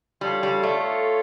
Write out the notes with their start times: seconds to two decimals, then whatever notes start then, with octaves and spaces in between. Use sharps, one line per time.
0.21 G3 F4 A4 C#5 F5
0.43 G3
0.63 A3